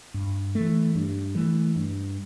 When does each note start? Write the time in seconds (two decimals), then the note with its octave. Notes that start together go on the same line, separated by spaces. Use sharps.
0.14 G2
0.55 E3 A3
0.95 G2
1.35 E3 A3
1.76 G2